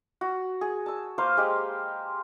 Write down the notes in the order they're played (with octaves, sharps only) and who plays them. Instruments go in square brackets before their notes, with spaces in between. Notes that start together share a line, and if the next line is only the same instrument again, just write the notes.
[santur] F#4
G#4
A5 E6
A#3 B4 C5 F5
G#3 G4